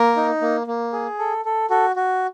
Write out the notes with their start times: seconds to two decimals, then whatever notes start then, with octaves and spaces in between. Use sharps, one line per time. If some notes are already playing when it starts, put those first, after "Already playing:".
Already playing: A#3 A#4
0.17 D#4
0.41 A#3
0.67 A#3
0.93 G#4
1.19 A4
1.45 A4
1.70 F#4 A4
1.96 F#4